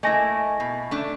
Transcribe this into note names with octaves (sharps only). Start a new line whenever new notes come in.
A3 A#3 E4 D#5 G#5 A#6
B2
A3 D4